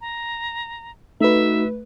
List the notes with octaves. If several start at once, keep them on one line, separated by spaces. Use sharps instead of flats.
A#5
A3 D#4 F#4 B4 E5